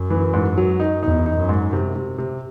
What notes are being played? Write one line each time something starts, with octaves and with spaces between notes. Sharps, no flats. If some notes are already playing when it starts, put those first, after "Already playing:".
Already playing: F#2
E3
G#2
F#3
D#4
E2 D#4
D#4
F#2
G#2
C3
C3
C3